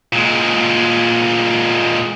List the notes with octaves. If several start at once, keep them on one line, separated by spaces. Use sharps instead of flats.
A#2 G#3